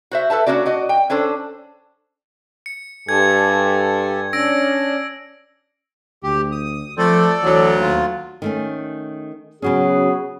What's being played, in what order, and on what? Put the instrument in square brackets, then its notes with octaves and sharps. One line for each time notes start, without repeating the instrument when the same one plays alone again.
[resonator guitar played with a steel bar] F#4 C5 E5
A4 B4 E5 A5
A#3 C#4 D4 F#4 D5
F#4 D5 D#5
G5
C#4 D4 A4 C5
[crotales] C#7
[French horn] G2 [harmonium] G4 A4 G#5 [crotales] G#6
[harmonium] C#4 D4 [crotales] E6 A#6 D7
[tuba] D2 [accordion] G4
[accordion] D#6
[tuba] F3 [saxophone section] A3 C4 [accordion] A4 D5
[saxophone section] D2 F#3 [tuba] E3
[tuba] D#2 [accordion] F4
[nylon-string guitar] D#3 A3 C#4
[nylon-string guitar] C#3 F#3 C#4 [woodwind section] B3 F#4 G#4